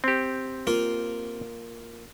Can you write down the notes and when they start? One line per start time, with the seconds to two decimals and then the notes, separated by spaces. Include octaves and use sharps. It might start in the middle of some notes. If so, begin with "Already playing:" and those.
0.04 C4 G4
0.67 A#3 F4